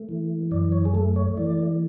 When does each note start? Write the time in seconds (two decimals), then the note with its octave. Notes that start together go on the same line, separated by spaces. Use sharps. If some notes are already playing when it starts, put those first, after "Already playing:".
Already playing: A3
0.09 E3
0.51 F#2 D5
0.72 C#5
0.85 G#4
0.94 A3 A4
1.16 C#5
1.37 E3 D5